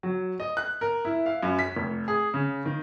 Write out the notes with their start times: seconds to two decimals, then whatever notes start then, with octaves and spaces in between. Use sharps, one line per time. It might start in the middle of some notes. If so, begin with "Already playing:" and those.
0.03 F#3
0.40 D#5
0.57 F#6
0.81 A#4
1.05 E4
1.26 F5
1.43 F#2
1.59 B6
1.77 F1
2.08 G#4
2.34 C#3
2.65 D#3